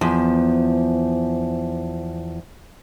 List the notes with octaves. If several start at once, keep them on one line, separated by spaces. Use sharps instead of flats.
E2 F3